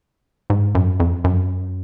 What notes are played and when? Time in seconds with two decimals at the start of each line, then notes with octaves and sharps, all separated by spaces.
0.50 G#2
0.75 F#2
1.00 F2
1.24 F#2